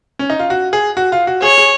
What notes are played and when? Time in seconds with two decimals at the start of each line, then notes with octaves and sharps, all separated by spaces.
0.19 C#4
0.30 D#4
0.39 F4
0.50 F#4
0.73 G#4
0.97 F#4
1.12 F4
1.27 F#4
1.42 G#4 C#5
1.58 G#4